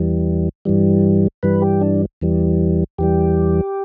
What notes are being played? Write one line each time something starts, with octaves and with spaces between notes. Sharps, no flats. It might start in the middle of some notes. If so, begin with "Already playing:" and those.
Already playing: E2 E3 G3
G2 E3 G3
G2 E3 G3 B4
G4
D4
E2 E3 G3
E2 E3 G3 G4